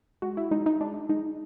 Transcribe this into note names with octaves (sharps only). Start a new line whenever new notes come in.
G#3 F#4
E4
G#3 D#4
D#4
G#3 D4
G#3 D#4